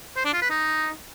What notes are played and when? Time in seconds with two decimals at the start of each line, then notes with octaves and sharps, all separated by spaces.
0.17 C5
0.25 D4
0.34 F4
0.42 B4
0.50 D#4